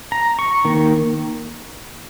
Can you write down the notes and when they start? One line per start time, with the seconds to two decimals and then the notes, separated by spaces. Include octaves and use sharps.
0.12 A#5
0.39 C#6
0.65 D#3 A#3